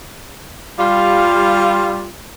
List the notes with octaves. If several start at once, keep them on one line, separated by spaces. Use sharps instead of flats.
G3 F4